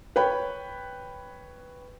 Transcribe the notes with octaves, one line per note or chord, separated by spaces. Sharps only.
B4 C#5 G5 B5